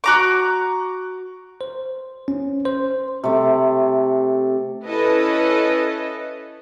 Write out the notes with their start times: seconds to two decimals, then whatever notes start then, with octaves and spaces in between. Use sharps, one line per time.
0.04 F#4 A#5 D6
1.61 C5
2.28 C#4
2.65 C5
3.24 C3 A3
4.86 C#4 E4 A4 B4 D#5